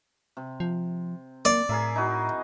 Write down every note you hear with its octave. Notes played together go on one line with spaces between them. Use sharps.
C3
F3
A#3 D5
A2 G#4 A#4 E5
D#4 E4 F#4